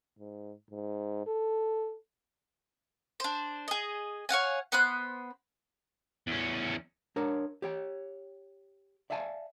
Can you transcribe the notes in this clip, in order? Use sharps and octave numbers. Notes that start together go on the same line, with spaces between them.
G#2
G#2
A4
D4 C5
G#4 D#5
C#5 F5 F#5 G#5
B3 C5 B5 F#6
E2 C#4
D4 A#4 C#5
G4 C#5 G5
D5 E5 F5 G#5 A5